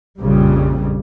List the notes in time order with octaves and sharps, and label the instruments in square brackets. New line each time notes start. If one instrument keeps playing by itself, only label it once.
[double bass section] A#1 F2 C#3 G3